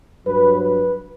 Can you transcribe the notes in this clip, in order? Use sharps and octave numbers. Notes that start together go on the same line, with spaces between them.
G2 F#3 B4
B4